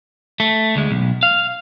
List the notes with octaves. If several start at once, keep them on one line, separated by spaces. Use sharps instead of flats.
A3
D2 G#3
B1
F5